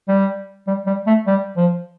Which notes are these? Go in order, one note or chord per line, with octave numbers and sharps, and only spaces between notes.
G3
G3
G3
A3
G3
F3